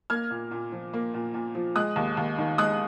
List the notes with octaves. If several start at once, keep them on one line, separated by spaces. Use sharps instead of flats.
A#3 F6 G#6
A#2
A#2
F3
A#3
A#2
A#2
F3
G#3 D#6 F#6
D#2
D#2
D#3
G#3 D#6 F#6